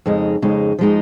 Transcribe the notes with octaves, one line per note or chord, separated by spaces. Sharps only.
F2 C#3 G#3 D#4
F2 C#3 G#3 D#4
F3 G#3 D#4